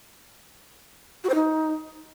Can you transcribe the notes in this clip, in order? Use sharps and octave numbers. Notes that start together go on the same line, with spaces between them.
F#4
C5
D#4